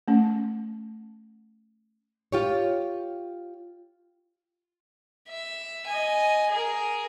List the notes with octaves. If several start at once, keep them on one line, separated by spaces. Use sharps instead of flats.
A3 C#4
F4 G4 C#5
E5
D#5 G#5
G#4 A#4